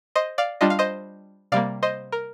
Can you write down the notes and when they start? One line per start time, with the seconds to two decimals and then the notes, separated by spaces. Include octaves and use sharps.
0.16 C5 D#5
0.38 D5 F5
0.61 G3 D4 F4 D#5
0.70 F5
0.79 C5 D#5
1.52 C3 G3 A#3 D5 F5
1.83 C5 D#5
2.12 A#4